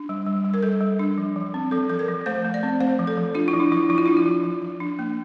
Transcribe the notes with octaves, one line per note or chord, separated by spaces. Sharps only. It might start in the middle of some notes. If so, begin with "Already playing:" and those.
Already playing: D4
G3
G3
G3
A#4
G3 A4
G3
D4
F3
F3
C4
F3 A4
F3 A4
A#4
F3
A3 C5
A3
D5
C4
A3 C5
F3
A4
F3
D4 F4
E4
F3
D4
F3 E4
F3 E4
F4
D4 E4
F4
F3
F3
F3
D4
A#3